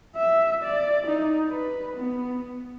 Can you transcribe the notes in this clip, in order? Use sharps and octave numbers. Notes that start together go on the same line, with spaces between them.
E5
D5
D#4
B4
B3